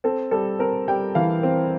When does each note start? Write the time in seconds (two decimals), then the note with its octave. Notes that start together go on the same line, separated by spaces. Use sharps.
0.04 C4 A4
0.31 G3 A4
0.59 C4 A#4
0.88 G3 G5
1.15 E3 F5
1.43 C4